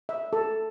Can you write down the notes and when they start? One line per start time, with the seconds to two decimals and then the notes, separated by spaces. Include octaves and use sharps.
0.09 E5
0.33 A4